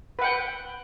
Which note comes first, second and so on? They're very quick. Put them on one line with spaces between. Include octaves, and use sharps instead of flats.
B4 F#5 G5